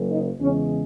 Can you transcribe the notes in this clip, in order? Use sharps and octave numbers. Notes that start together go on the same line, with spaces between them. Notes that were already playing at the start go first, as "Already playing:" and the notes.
Already playing: F#1 F#2 C#3
D#4
E2 C#3 G#3 C#4